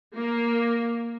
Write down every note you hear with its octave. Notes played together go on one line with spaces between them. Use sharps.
A#3